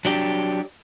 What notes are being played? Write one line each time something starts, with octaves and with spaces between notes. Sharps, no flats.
F#3 D4 G4